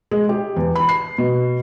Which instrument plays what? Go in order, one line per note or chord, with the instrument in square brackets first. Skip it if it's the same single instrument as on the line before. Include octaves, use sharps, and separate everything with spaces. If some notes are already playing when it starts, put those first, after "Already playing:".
[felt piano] G#3
G4
E2
B5
C7
B2